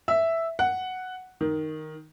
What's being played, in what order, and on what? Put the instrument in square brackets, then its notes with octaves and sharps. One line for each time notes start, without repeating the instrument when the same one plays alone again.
[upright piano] E5
F#5
D#3